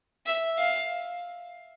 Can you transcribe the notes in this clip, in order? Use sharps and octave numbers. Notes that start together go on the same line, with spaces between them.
E5
F5